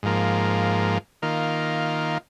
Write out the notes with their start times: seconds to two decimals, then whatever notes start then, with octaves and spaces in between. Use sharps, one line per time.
0.03 G#2 F3 A#3
1.22 D#3 A#3 F4